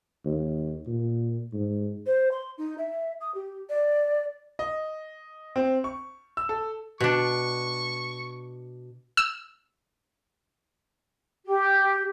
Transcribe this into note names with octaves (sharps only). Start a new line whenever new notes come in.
D#2
A#2
G#2
C5
C6
D#4
E5
D#6
G4
D5
D#5
C4
C#6
E6
A4
B2 D4 C#6
E6
G4